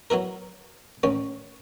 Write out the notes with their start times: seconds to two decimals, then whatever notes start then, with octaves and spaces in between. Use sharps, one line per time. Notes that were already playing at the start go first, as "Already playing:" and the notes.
0.10 F#3 B3 E4 A#4
1.03 A1 D#2 C#4